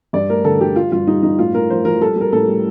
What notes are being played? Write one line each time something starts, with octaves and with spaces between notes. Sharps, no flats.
G2 D5
A3 A#4
D3 A4
D3 G4
G3 F4
G2 F4
G3 D#4
G2 D#4
A2 F4
A2 A#4
F3 C5
F3 A#4
G3 A4
G3 A#4
A2 A4
G3